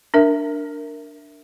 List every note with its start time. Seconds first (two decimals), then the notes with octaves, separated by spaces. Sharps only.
0.14 D4 A#4 E5